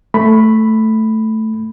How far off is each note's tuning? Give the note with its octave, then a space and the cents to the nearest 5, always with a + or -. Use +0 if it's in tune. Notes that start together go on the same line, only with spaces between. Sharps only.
A3 +0 B5 +0